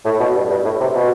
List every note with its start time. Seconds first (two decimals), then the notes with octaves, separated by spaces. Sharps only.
0.05 A2
0.20 B2
0.35 G2
0.50 G2
0.65 A2
0.80 C3
0.95 B2